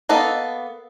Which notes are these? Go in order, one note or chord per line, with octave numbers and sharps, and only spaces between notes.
A#3 B3 A4 D#5